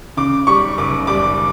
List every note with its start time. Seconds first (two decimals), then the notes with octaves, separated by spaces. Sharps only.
0.17 C#3 D6
0.47 G3 C#6
0.78 F#1 D6
1.07 G3 D6